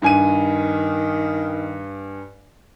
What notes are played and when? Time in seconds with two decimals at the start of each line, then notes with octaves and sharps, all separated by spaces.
0.02 G2 D#3 G#5 D#7